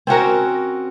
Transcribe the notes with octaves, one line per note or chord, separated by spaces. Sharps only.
C4 C#4 F#4 A#4